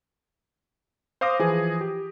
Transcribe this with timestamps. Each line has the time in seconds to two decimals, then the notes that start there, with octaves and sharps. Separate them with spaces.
1.21 C5 F5 D6 D#6 A#6
1.39 E3 F3 G#4
1.81 G4